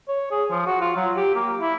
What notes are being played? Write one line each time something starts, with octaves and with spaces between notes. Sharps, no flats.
C#5
G#4
F3
F#4
F4
F#3
G4
A#3
E4